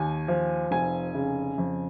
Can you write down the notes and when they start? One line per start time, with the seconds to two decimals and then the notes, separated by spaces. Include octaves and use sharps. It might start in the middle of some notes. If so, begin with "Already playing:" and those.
Already playing: D#2 G#5
0.28 F3
0.71 F1 G#5
1.15 C#3
1.58 F2